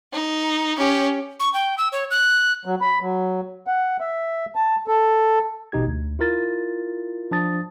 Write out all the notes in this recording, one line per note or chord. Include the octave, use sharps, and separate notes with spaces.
D#4
C#4 G4
C#6
G5
E6
C#5
F#6
F#3
B5
F#3
F#5
E5
A5
A4
A1 B2 D#4 G4 G#6
D2
E4 F4 A#4 A6
F3 D4 A5 D#6 A6